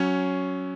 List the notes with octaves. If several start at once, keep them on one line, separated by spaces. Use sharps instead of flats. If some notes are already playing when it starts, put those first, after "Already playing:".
Already playing: F#3 C#4 C#5